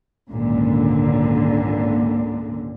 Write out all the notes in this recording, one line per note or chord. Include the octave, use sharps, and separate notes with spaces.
G#1 C#2 A#2 D3